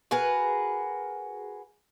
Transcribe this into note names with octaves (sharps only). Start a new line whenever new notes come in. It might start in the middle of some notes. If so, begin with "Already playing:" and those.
F#4 G#4 A#4 B4